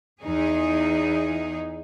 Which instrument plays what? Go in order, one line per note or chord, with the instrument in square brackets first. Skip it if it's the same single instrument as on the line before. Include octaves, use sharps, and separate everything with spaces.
[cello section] E2 D#4 G#4